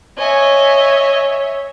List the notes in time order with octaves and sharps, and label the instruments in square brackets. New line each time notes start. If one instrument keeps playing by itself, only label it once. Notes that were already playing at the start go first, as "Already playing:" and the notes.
[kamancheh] C#5 E5 [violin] D#5 G#5